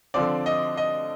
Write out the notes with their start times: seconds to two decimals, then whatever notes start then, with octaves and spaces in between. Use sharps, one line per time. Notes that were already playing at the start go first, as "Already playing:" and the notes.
0.14 D3 F3 C4 D5
0.46 D#5
0.77 D#5